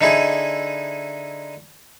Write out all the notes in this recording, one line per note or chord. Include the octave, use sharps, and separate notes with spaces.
D3 D#4 E4 G#4